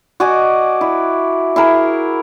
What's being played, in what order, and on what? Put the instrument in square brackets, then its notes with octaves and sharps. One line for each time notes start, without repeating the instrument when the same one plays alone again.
[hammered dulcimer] F#4 D5 D#5 G#5
E4
E4 G#4 A#4